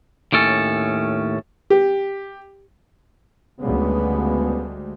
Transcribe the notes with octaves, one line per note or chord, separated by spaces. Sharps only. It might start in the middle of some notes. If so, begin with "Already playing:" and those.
D#2 A2 C#4 A4
G4
D2 C#3 G3 G#3 B3